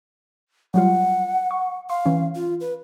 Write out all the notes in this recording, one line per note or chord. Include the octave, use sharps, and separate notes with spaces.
F#3 G3 F4 F#5
C#6
F5 C6
E3 C#4
F4
B4